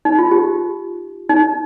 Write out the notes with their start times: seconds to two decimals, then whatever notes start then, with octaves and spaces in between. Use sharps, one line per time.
0.05 D#4
0.19 F4
0.31 G4
1.29 D#4